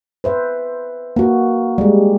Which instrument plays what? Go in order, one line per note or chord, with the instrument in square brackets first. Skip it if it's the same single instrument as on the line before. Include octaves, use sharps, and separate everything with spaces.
[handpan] B4 C5 E5
A#3 F#4
G3 G#3